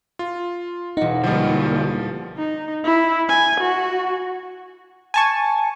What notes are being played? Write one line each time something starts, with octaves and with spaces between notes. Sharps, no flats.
F4
E1 D#4 F#5
D3 F3 G3 A#3
D#4
E4
G#5
F#4
G#5 A5 C#6